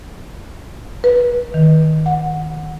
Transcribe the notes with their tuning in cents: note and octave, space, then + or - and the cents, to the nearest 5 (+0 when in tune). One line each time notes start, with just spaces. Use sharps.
B4 -25
D#3 +5
F#5 -10